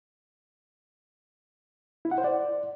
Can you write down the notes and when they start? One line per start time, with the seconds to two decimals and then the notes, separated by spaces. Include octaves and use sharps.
2.05 E4
2.11 F#5
2.18 C5
2.24 D5